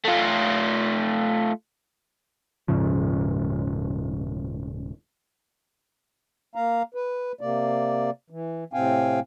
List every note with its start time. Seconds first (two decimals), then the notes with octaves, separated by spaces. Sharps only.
0.05 A3 F4
2.68 D#1 G#2 C#3 F3
6.55 A#3 F5 A#5
6.94 B4
7.41 C3 A#3 D5
8.30 E3
8.73 A2 C3 C4 F5 G5 G#5